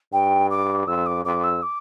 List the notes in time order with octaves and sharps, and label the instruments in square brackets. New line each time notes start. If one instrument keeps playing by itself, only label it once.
[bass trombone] G2 [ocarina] G5
[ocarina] D6
[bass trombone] F2 [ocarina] E6
[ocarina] D6
[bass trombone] F2 [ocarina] D6
[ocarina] E6
D6